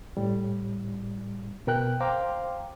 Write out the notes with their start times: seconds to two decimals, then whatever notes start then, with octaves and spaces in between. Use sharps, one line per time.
0.17 A2 G3
1.67 B2 A#4 G5 F#6
2.00 C5 F5 G5 A#5 C6 D6